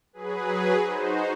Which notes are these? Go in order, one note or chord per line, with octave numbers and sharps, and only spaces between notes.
F#3 G#4 B4
D#4 F#4 C5